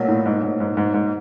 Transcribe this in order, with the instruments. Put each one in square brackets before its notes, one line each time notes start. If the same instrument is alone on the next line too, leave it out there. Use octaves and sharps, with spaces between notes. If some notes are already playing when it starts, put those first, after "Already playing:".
Already playing: [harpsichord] B1 A#2 F#3 A3 C#4
[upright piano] A2
G#2
G#2
G#2
G#2
G#2